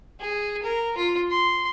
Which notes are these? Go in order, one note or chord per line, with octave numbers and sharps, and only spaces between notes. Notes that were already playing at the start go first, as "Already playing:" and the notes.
G#4
A#4
F4
C6